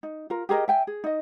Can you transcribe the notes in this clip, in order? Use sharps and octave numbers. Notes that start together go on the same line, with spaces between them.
D#4
F4 A#4
G4 G#4 A#4 D#5
E5 G5 G#5
G#4
D#4 D#5